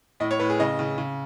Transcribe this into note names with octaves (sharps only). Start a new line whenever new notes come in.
A2 D#5
C#5
A2 B4
G#4
C#3 D#5
C#3
C#3